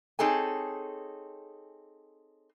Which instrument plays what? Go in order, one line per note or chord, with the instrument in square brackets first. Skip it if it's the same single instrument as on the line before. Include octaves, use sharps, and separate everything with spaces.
[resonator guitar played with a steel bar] C4 D#4 G#4 A4 C#5 G#5